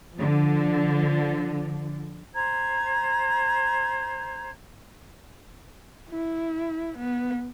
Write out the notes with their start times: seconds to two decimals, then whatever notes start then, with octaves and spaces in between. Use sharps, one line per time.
0.16 D3 F3
2.35 C5 A#5 G#6
6.10 E4
6.98 B3